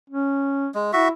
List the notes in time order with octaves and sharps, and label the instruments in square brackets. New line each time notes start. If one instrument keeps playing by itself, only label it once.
[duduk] C#4
[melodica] G#3
[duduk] E4 [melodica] F#4 E5